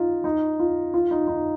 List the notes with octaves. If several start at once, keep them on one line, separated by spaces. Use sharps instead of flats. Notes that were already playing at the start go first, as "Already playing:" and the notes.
Already playing: D#4 F4
D#4
F4
F4
D#4
D#4